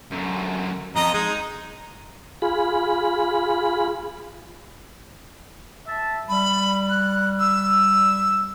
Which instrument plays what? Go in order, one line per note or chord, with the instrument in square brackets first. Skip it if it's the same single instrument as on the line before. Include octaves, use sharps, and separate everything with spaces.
[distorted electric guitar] F#2 D3
[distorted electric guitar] F2 [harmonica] D#5 A#5
[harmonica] G#3 [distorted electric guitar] D#4
[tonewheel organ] F4 G#4 B5
[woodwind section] E5 A5
[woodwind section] G3 [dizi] B5
[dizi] F#6
E6